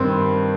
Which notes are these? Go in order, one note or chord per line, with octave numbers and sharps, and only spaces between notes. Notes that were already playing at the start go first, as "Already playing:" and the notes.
Already playing: G2 D#3 C4